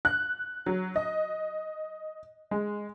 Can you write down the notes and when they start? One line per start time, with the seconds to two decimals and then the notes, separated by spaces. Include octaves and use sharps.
0.05 F#6
0.66 F#3
0.96 D#5
2.51 G#3